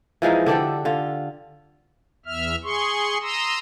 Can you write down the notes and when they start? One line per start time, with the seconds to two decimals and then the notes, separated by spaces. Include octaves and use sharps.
0.22 E3 F3 G#3 D#4
0.46 D3 D4 G4 A4
0.85 D3 F4
2.26 E2 E5 F6
2.64 G#4 C6 C#6
3.22 A#5 C6 D#6 E6